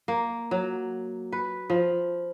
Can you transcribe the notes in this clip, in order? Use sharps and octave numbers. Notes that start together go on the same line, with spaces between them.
A#3
F#3
B4
F3